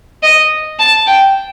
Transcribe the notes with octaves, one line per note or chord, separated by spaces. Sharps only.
D#5
A5
G5